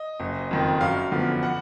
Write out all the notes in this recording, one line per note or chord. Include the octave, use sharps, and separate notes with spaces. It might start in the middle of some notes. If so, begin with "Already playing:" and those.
Already playing: D#5
F#1
F2 D#3
F#2 F5
D3 F3 B3
F#5